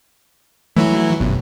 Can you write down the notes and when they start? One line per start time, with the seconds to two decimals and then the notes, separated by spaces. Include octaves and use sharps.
0.76 E3 F#3 A3 E4
1.21 G1 C#2 F#2 B2